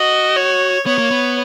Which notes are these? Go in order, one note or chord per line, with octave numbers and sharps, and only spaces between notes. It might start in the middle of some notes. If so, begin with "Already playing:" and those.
Already playing: F#4 D#5
C#5
B3 C#5
A#3
B3